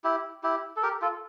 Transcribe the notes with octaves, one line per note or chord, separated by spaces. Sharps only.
E4 G4
E4 G4
A4
G4 A#4
F4 A4